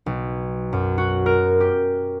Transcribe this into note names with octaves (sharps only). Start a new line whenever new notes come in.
B1
F#2
F#4
A#4
G4